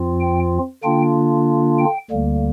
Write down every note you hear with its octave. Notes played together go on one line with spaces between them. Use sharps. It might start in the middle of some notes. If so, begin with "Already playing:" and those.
Already playing: F2 F3 C4 F4
G5
D3 A#3 D4 F4 G5
G5
D2 D3 G3 A#3